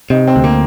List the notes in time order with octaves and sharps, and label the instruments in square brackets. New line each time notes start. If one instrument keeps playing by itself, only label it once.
[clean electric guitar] C3 [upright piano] D#4
[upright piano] C4
[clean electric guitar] D2
[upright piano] A#3